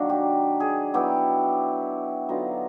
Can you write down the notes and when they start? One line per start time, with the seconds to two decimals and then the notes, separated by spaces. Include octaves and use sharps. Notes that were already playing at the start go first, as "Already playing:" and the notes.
Already playing: D#3 F#3 A#3 D4
0.09 G4
0.60 G#4
0.94 F#3 B3 E4 G4
2.29 D3 F#3 B3 D#4 F4